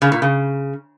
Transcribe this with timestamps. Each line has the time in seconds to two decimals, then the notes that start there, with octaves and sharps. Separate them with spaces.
0.02 C#3
0.12 A#2
0.22 C#3